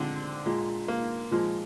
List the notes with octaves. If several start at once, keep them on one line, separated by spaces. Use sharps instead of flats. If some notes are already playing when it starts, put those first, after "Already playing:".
Already playing: A#2 D3 F3 G#3 C4 D4
A#2 G#3
A#3
A#2 F3 G#3